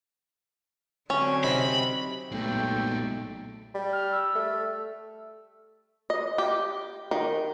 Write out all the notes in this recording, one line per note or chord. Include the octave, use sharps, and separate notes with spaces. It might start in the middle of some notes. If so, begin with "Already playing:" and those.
D3 F#3 C4 C#4
C3 D#4 B5
B1 A#2 G#3 A3 G5
G3
F6
E6
A3
D#5
G4
D#3